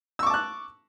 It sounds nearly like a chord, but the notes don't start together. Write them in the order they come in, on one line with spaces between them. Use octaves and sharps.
E6 C#6 D6 A5 F#6